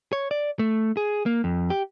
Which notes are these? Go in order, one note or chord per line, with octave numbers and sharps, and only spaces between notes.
C#5
D5
A3
G#4
A#3
F2
G4